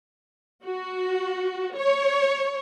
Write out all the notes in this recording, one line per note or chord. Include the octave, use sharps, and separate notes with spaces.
F#4
C#5